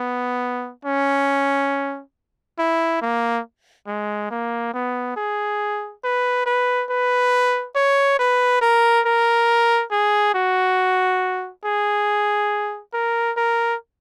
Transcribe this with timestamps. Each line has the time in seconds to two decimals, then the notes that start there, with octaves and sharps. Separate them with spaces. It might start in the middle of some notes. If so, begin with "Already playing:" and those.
Already playing: B3
0.85 C#4
2.59 E4
3.02 A#3
3.87 G#3
4.31 A#3
4.74 B3
5.17 G#4
6.04 B4
6.46 B4
6.90 B4
7.76 C#5
8.19 B4
8.62 A#4
9.06 A#4
9.91 G#4
10.34 F#4
11.65 G#4
12.93 A#4
13.37 A#4